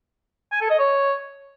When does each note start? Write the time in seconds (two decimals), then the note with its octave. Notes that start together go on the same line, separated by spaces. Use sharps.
0.52 G#5
0.61 A4
0.70 D#5
0.79 C#5